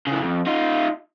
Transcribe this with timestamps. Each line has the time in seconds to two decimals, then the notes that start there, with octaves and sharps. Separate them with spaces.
0.07 C#3 E3
0.20 F2
0.46 D#4 F4